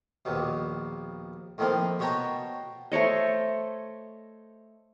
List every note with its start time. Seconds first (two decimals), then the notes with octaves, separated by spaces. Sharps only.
0.25 A#1 D#2 B2
1.58 A2 D#3 F3 A#3 C4
1.99 B2 F#4 C#5 G5 A5 A#5
2.92 A3 C5 C#5 D#5